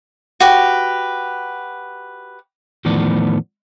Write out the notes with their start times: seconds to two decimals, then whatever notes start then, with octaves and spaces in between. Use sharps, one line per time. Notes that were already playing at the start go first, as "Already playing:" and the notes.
0.40 F#4 G4 B4
2.85 E2 A2 D#3 F3 B3 D5